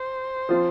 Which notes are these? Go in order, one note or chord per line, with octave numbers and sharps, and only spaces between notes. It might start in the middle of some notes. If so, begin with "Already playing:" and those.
Already playing: C5
F3 C4 F4